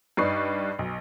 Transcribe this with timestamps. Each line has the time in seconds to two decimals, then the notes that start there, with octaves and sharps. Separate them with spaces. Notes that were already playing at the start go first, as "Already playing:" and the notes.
0.17 G2 D#4 B4 D5 C#6 C7
0.79 B1